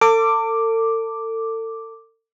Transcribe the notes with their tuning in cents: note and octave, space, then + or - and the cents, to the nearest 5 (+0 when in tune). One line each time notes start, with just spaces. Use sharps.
A4 +40 D6 +0